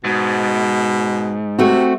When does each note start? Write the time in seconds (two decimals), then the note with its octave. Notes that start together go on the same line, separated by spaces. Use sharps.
0.04 G#2 B2
1.59 C3 A3 C4 F#4